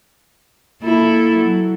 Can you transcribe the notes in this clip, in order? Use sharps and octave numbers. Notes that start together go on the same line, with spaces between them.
A#3 E4 A4
F#3